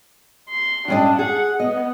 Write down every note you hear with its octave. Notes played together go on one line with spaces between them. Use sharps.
C6
G2 C#4 D4 D#5
G#4 F#5
B3 D#5